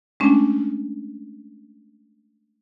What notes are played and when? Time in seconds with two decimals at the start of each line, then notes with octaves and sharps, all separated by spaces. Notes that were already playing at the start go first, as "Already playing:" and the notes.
0.20 G#3 A3 C#4 D4